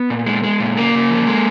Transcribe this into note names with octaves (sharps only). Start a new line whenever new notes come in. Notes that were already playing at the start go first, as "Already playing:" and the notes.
Already playing: B3
A#2
G#3
G#3
A#2
C#3 A#3
C#3
F3
G#3